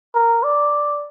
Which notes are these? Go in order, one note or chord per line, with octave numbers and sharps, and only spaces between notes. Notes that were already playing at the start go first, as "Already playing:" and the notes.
A#4
D5